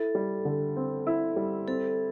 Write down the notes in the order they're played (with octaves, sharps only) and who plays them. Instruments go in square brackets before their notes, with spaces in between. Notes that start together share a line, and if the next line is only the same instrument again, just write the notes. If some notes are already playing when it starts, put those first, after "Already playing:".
Already playing: [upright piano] E4 [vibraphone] A4
[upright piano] G3
D3
C4
E4
G3
[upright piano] C4 [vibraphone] A4